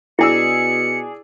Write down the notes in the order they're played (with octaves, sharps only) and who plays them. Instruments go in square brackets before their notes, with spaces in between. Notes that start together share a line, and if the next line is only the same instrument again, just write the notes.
[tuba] B2 [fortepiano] D4 G#4 E6 [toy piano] E4 [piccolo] C#7